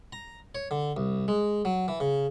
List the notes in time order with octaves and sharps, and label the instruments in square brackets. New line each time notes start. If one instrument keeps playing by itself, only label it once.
[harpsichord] A#5
C#5
D3
C2
G#3
F#3
E3
C#3